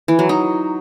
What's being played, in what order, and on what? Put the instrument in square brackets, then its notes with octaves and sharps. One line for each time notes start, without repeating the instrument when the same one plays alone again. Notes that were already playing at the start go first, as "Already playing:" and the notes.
[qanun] E3
F#3
D#4